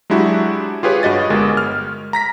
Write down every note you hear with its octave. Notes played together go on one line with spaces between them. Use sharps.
F#3 G#3 D4 E4 F#4 G4
F4 G4 G#4 B4 C#5
G2 F#4 D#5 A6
G1 G#3 A#4
F6
A#5 A#6 B6